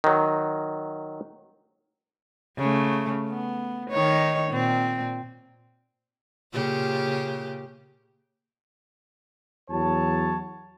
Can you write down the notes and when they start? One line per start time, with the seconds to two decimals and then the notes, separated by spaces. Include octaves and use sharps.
0.04 D#3 F#3
2.58 C#3 A3
3.29 B3
3.90 D#3 D#4 C#5
4.51 A#2 C4
6.52 A#2 C#3 G4
9.70 E2 F#3 C#5 A5